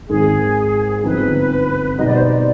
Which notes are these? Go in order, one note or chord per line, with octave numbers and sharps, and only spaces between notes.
G#1 G#2 D#3 G#3 G#4
G1 G2 F3 C4 D#4 B4
B2 G3 B3 D#4 D#5
D5
C5
D5